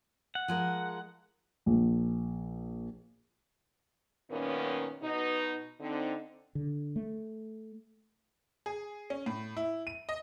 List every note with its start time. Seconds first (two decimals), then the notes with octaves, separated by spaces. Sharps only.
0.35 F#5
0.48 F3 G#3 A#4
1.66 A#1
4.31 F#2 A#2 D#3 A#3 B3 C#4
5.03 B2 D#4
5.81 D3 C4 D#4
6.55 D3
6.96 A3
8.66 G#4
9.10 C#4
9.26 A2
9.57 E4
9.87 D#7
10.09 D#5